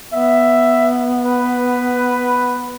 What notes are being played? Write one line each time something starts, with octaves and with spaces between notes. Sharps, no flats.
B3 E5
B4